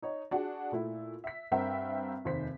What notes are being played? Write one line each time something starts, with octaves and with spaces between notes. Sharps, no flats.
D#4 C#5
D4 F#4 G#4
A#2 A3 E4
E5 B6
G2 C4 A#4 E5 F#5 G5
F1 D#2 C5 B6